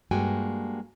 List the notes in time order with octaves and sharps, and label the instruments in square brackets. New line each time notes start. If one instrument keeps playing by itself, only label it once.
[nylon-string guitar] G2 G#3 A#3 F#4 G5 G#5